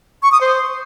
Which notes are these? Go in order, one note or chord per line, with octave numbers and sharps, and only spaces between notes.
C#6
D#6
C5